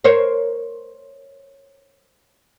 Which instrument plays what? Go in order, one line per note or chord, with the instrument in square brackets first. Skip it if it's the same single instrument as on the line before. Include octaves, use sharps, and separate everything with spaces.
[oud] A#4 C5 C#5